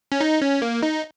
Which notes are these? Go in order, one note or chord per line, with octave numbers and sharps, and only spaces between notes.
C#4
D#4
C#4
A#3
D#4